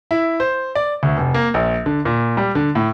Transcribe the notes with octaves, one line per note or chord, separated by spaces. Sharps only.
E4
C5
D5
D2
F1
A#3
A#1
D3
A#2
G3
D3
A2